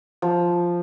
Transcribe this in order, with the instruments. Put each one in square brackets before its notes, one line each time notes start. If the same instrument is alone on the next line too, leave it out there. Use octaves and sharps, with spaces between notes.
[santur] F3